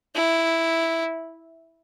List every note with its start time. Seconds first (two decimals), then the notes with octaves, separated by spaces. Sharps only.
0.15 E4